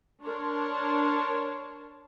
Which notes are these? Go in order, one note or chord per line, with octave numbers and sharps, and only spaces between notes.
D4 A#4 C#5 A5 C6